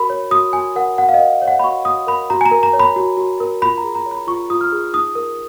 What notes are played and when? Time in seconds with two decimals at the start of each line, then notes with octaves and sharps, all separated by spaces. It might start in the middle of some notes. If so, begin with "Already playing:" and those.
Already playing: F#4 A#4 B5
0.10 C#5
0.31 F#4 D#6
0.53 F#4 G#5
0.76 A#4 F#5
0.98 F#4 F#5
1.09 F5
1.14 D#5
1.20 A#4
1.42 C#5
1.48 F#5
1.59 B5
1.64 F#4 C#6
1.85 F#4 D#6
2.07 A#4 B5
2.30 F#4 A#5
2.41 G#5
2.46 A#5
2.51 A#4
2.63 A#5
2.73 C#5
2.80 B5
2.96 F#4
3.17 F#4
3.40 A#4
3.62 F4 B5
3.78 A#5
3.84 G#4
3.95 A#5
4.06 C#5
4.11 B5
4.27 F4 C#6
4.50 F4 D#6
4.61 F6
4.72 G#4
4.93 D#4 D#6
5.15 A#4